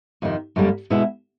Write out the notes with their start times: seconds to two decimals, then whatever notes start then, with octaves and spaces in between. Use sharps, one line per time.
0.22 F2 C3 D#3
0.56 F#2 D3 G3 A#3
0.90 B2 G#3 B3 E4